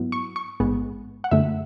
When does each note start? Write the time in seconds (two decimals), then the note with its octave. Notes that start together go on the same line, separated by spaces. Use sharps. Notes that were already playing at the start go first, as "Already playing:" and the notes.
Already playing: G#2 F#3 B3 E4
0.12 C#6
0.36 C#6
0.60 A1 G#2 G#3 B3
1.24 F#5
1.31 F#2 D3 A3 E5